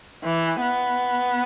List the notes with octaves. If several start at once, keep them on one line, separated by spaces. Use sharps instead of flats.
E3
B3